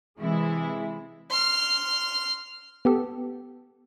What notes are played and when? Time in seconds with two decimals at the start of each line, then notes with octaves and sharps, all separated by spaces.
0.19 C3 E3 G#3 E4
1.31 C6 F6
2.85 B3 G4 A4